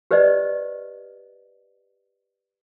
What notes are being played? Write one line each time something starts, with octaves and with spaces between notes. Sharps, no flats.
G4 B4 C5 D5 D#5